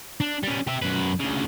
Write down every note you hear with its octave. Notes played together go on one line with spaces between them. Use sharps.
D4
G3 C#4
G4 E5
F#2 B4
D2 C#3